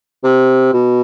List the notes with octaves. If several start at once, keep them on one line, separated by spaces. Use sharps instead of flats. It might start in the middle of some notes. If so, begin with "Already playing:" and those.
C3
B2